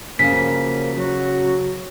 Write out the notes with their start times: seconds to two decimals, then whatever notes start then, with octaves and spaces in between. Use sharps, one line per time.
0.19 C#3 F3 F#3 A#3 B6
0.95 F#3 F#4